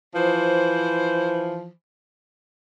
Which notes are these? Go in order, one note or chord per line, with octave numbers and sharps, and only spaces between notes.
E3 F3 C5